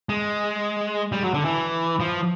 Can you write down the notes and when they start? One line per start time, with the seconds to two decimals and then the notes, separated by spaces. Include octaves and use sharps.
0.09 G#3
1.12 G3
1.23 F#3
1.34 D3
1.45 E3
2.00 F3